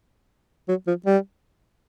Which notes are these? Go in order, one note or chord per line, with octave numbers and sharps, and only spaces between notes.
F#3
F3
G3